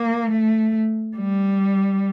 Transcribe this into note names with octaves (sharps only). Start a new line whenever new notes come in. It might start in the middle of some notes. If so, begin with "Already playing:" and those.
Already playing: A#3
A3
G3